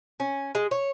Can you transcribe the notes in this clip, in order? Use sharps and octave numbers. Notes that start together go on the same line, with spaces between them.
C#4
G#3
C#5